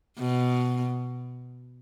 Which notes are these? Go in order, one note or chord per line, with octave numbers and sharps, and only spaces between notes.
B2